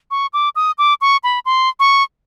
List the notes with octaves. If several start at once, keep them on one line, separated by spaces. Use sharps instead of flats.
C#6
D6
D#6
D6
C#6
B5
C6
C#6